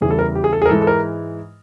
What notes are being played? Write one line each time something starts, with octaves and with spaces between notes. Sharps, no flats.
E2 C#3 E3 G3 G#4
A4
A#4
G4
G#4
A4
G#4
A#4
G#2 E3 G#3 A4
A4
A#4